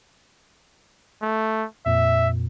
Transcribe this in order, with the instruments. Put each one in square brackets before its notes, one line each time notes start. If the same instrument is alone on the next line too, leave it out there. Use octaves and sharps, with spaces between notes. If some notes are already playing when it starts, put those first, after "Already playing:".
[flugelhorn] A3
[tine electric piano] F2 A#2 [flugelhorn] E5